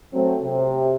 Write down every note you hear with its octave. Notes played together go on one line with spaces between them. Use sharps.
F#3 A3 C4
C3